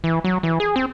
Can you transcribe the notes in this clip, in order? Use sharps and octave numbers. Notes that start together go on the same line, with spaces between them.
E3
F#3
E3
G#4
C4